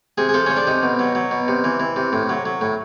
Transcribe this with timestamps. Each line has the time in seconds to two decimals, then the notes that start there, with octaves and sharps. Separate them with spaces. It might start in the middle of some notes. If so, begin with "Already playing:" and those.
0.18 C3 G#4
0.29 G#4
0.34 F3 A4
0.46 F3 C#4
0.57 D4
0.67 C3 D#4
0.83 B2
0.99 F#3
1.15 F#3
1.31 B2
1.48 C3
1.64 E3
1.80 E3
1.96 C3
2.13 A2
2.29 F#3
2.45 F#3
2.61 A2